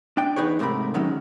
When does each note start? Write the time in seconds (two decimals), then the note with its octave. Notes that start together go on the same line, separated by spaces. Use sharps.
0.17 D4 G5
0.36 E2 D#4 G#4 B4 C#5
0.59 G#2 C3 A3 C4 A#4 B5
0.94 D#3 F#3 G#3 C#4 D#4